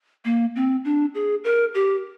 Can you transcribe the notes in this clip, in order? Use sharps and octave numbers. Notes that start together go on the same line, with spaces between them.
A#3
C4
D4
G#4
A#4
G4